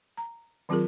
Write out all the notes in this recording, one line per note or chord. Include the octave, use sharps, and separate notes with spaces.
A#5
D#3 F#3 C4 F4 G#4 A#4